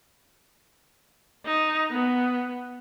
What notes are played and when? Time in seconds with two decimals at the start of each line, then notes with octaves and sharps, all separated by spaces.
1.45 D#4
1.91 B3